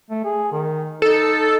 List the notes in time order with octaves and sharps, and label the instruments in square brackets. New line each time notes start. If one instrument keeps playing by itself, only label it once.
[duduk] A3
G#4
D#3
[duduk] D#4 [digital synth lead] A4